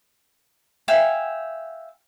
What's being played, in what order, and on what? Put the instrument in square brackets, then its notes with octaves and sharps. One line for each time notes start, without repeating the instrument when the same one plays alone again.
[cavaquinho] E5 F5 G5 G#5